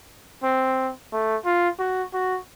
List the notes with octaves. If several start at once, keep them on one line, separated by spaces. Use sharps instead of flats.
C4
A3
F4
F#4
F#4